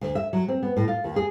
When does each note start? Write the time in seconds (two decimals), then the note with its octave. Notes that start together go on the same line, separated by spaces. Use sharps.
0.01 D2
0.15 E5
0.33 F#3
0.48 C4
0.63 B3
0.77 A2
0.88 F4
1.04 D#2
1.16 G#4